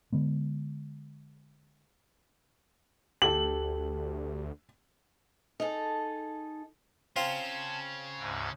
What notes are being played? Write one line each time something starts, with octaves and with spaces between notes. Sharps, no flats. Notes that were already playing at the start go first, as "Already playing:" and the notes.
D3 G#3 B3
D2 G4 A4 A5 F#7
D#4 G#4 A4
C#3 C4 C#4 F4 A5
D2 G#2